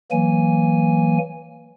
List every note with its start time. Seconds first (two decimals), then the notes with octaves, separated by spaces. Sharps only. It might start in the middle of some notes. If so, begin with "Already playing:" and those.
0.11 E3 F#3 A#3 G#5